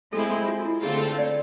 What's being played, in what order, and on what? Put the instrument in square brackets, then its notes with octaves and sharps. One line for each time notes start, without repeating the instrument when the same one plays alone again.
[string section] G#3 C4 E4 [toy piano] A4
[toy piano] F4
F4
E4
[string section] D3 A3 C4 F4 A4 [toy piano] G#4
[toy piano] B4
D5